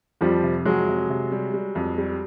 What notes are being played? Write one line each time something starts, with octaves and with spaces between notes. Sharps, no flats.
F2 F3 G3
C3
F2 F#3 G#3
C3
C3
G3
G3
F2
G3